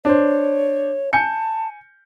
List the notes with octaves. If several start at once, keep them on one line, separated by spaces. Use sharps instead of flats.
D4 C5 C#5
G#5 A5 G6 C#7